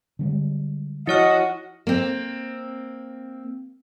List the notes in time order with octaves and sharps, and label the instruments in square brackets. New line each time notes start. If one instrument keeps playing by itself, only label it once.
[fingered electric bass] D3 G3 G#3
[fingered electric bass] F3 [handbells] E4 C#5 F6 [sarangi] F#4 [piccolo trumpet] D#5
[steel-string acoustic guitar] A#3 C4